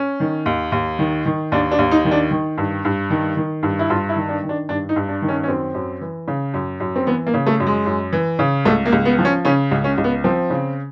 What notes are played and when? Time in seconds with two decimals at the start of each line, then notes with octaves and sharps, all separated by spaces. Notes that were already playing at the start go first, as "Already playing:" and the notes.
Already playing: C#4
0.20 D#3
0.46 D#2
0.72 D#2
0.99 D#3
1.26 D#3
1.52 D#2 D4
1.71 D4
1.79 D#2
1.91 D#4
2.05 D#3
2.11 D4
2.31 D#3
2.58 G2
2.85 G2
3.10 D#3
3.37 D#3
3.63 G2
3.79 E4
3.90 G2 F4
4.09 E4
4.16 D#3
4.29 D4
4.43 D#3
4.49 D4
4.69 G2 D4
4.89 D#4
4.96 G2
5.08 D4
5.22 D#3
5.28 C#4
5.44 C#4
5.48 F#2 C4
5.74 F#2
6.01 E3
6.28 C#3
6.54 F#2
6.80 F#2
6.96 C4
7.07 E3 B3
7.27 A#3
7.34 C#3
7.47 A3
7.60 F#2
7.67 G#3
7.86 F#2
8.13 E3
8.39 C#3
8.65 C#2 A3
8.85 A#3
8.92 C#2
9.05 B3
9.19 F3
9.25 C#4
9.45 C#3 C#4
9.71 C#2
9.84 C#4
9.98 C#2
10.04 B3
10.24 F3 C4
10.50 C#3